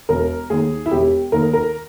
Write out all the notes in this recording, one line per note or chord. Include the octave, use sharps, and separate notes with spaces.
E1 A#4
D#2 D#3 G#4
E4
E1 G4
D#2 D#3 A#4
A#4